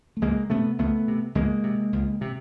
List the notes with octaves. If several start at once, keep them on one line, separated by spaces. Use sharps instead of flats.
A3
C#2 G#3 A#3
C3 A3 B3
C#2 A3 B3
C3
C#2 G#3 A#3
C3
C#2
C3